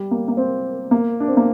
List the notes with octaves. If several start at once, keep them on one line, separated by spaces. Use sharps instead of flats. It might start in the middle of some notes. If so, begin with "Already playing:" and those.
Already playing: G3
A#3
A#3
C4
A#3
D4
C4
A#3